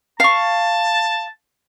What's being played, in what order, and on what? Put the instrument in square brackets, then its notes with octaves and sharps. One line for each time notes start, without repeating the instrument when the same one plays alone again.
[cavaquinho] F5 C#6 [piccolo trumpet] A5